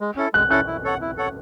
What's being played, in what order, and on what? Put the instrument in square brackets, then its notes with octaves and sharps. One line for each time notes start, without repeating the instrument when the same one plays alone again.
[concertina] G#3
C#4 E4 A4
[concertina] G#3 [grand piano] F#6
[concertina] C#4 E4 A4 [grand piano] F#6
[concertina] E4
A4 C#5 F#5
E4
A4 C#5 F#5